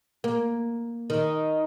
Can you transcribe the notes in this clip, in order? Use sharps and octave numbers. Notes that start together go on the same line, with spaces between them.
A#3
D#3